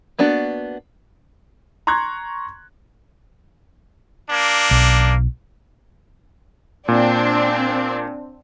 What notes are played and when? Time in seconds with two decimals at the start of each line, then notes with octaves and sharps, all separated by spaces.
0.18 A#3 B3 D4 F#4
1.87 A#5 C6 C#6 F#6 G#6
4.30 A#3 D4
4.71 B1
6.88 A#2 C4 D4